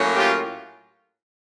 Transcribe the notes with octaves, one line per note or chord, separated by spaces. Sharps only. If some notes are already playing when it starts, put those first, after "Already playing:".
Already playing: A2 F#3 A#3 C#4
F4 G4